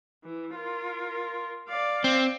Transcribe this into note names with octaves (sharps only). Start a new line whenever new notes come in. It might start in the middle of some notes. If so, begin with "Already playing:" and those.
E3
F4 A#4
D5 F5
C4